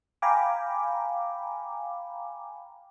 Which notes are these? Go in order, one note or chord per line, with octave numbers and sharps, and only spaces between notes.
F5 G5 G#5 A#5 B5 D6